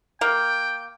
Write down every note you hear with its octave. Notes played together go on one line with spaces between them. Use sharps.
A#3 G5